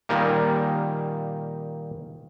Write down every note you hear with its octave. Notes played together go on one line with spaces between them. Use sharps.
A#2 D#3 G3 A#3